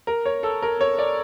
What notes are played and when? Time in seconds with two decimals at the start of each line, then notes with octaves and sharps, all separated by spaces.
0.07 A#4
0.26 C#5
0.43 A4
0.62 A#4
0.81 C#5
0.99 D5